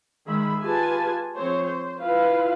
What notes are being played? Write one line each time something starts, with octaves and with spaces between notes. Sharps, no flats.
D#3 G#3 G#4 E5 B5
F4 G4 G#4 B4 G#5 A5
F3 C4 G#4 C5 C#5
C5
E4 F4 B4 F5